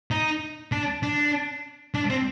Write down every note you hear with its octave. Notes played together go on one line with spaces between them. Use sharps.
D#4
D4
D4
D4
C4